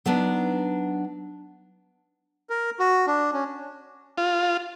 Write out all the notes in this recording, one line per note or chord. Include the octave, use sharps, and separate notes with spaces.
F#3 B3 D4 D#4
A#4
F#4
D4
C#4
F4